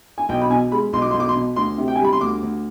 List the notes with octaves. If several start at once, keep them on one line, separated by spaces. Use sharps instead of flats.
G#5
B1 G5
B5
B2 G#5
G#3 B5
B1 C6
D6
B1 C6
D6
C6
B2
D2 C6
C3
G5
G#5
G3
B5
C6
D2 D6
D2